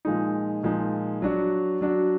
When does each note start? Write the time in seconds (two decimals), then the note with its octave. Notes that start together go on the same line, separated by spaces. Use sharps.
0.05 A#2 F3 G#3 D#4
0.63 A#2 F3 G#3 D#4
1.22 F#3 D4 F#4
1.81 F#3 D4 F#4